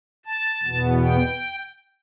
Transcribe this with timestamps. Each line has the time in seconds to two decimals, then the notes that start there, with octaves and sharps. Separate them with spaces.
0.25 A5
0.63 E2 B2 B3
1.02 G5